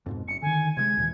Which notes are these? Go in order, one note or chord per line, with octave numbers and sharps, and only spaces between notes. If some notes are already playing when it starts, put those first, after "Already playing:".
F2 G#2 B2
F#1 C#7
D3 D#3 G#5
C3 F#3 G#3 G#6
D#2 A#2 E3